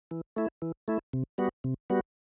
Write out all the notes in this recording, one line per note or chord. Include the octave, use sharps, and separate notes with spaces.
E3
A3 E4
E3
A3 E4
C3
G3 B3 F#4
C3
G3 B3 F#4